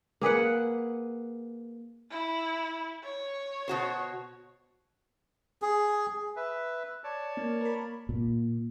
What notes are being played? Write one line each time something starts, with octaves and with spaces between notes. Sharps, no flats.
A#3 G#4 B4 F#5
E4
C#5
B2 F#4 C5
G#4
B4 E5
C#5 D5 A5
A#3
A#4 B5
A#2